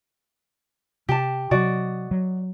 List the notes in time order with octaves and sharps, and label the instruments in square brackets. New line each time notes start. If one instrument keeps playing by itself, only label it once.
[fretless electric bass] C3 [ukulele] G4 A5
[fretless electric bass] C3 F#3 [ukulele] F#4 D5 D#5
[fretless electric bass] F#3